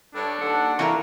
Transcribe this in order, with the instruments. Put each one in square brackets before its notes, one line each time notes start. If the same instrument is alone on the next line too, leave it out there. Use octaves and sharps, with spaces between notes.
[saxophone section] G2 C#5 [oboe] D4 [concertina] A4
[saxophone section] D#2 F#5 [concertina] A4
[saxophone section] D3 F4 [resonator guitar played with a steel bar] E3 E4 A#4 [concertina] F5 C#6